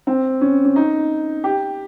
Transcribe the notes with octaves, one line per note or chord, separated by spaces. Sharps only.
C4
C#4
C#4
D#4
G4